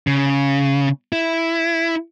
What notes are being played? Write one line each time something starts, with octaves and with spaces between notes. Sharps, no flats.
C#3
E4